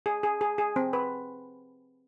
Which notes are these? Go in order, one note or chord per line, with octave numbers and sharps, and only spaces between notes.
G#4
G#4
G#4
G#4
C4
B4